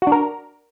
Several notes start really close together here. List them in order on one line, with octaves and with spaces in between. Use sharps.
F#4 D4 A#4